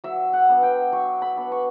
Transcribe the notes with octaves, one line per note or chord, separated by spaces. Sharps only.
F#3 E5
F#5
B3 D4
G5
F#3 C#6
B5
B3 D4
C#6